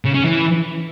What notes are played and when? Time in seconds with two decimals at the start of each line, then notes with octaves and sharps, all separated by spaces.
0.05 C#3
0.15 C#4
0.25 E3